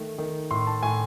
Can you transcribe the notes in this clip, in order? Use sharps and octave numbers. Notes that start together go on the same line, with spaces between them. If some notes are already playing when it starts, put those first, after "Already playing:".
Already playing: D#3 A3
D#3
A2 C6
A5
A2 G#5